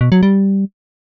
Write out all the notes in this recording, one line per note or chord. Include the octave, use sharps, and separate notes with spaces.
B2
F#3
G3